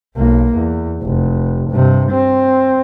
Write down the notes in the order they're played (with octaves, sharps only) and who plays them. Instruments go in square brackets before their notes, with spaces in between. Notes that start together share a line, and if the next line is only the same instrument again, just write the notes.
[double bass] B1 A#3
E2
F1
G2 C3
C4